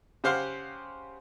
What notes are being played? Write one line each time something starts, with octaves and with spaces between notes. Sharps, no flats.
C#3 G4 C5 F5 F#5 C6